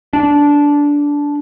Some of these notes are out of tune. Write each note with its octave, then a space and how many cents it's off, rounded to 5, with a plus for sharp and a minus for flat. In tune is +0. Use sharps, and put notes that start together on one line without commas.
D4 -15